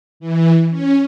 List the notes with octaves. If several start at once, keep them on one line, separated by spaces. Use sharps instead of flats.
E3
C#4